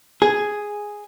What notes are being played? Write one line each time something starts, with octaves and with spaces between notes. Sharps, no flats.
G#4